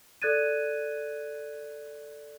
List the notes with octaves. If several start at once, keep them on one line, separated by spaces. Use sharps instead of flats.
A4 D5 F#6 G#6 A6 D#7